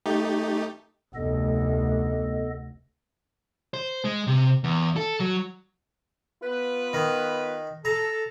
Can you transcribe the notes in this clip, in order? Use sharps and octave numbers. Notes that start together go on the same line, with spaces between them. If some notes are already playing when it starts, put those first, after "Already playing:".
A3 D#4 G4
F1 D2 B3 A4 D#5
C5
G#3
C3
E2
A4
F#3
B3 F4 B4
D#3
A4 A#5